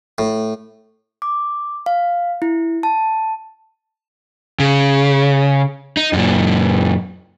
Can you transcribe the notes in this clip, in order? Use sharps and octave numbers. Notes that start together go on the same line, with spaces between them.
A2
D6
F5
E4
A5
C#3
D#4
F#2 A#2